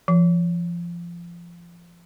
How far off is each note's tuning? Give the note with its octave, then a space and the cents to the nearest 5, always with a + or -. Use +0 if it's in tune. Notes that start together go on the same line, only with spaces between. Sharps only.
F3 -25